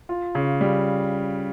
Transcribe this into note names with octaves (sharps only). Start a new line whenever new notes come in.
F4
C#3
G3